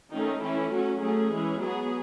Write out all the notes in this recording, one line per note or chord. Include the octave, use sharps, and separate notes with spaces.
D#3 A3 C#4 D#4
E3 A3 C#4 E4
F#3 C#4 F#4
F#3 A3 C#4 G#4
E3 G#3 C#4
F#3 B3 G#4